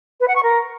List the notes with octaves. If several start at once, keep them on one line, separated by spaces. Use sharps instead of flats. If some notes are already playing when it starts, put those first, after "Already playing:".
B4
F#5
C#6
A#4